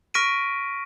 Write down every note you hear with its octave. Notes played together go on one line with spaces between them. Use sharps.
C#6 F6 A#6 B6 D7 D#7